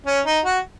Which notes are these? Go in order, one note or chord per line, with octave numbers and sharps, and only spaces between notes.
C#4
D#4
F#4